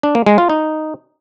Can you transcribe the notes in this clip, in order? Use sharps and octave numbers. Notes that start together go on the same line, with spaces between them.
D4
A#3
G#3
F4
D#4